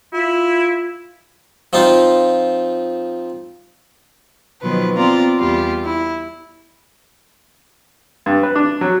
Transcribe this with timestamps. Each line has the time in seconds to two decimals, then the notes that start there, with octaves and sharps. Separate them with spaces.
0.14 E4 F4
1.73 F3 C4 D#4 F4
4.62 B2 D#3 F3 F#3 B4
4.95 B3 C4 F4 D5 A#5
5.40 E2 G3 F4
5.87 E4
8.26 G2
8.43 B4
8.55 D4
8.81 F#3